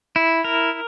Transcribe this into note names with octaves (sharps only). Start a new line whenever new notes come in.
E4
A#4